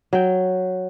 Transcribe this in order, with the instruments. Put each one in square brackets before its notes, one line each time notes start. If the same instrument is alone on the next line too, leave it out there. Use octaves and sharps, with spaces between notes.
[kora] F#3 G5